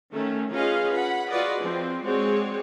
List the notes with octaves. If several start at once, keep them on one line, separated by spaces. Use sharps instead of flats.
D#3 A3 C#4
C#4 F4 G#4 B4 D#5 F5
F#5 B5
F4 F#4 G#4 B4 D5 D#5
F3 C4
G#3 C4 F#4 G#4 C#5 D5